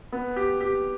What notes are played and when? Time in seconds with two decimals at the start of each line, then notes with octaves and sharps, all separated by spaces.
0.12 B3
0.36 G4
0.61 G4